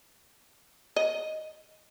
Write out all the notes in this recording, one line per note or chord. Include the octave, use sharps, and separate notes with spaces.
D#5